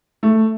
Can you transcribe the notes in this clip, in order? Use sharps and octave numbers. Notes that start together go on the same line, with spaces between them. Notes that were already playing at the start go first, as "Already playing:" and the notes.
A3